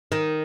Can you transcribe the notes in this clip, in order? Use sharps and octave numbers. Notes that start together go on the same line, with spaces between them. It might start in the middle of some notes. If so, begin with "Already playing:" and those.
D#3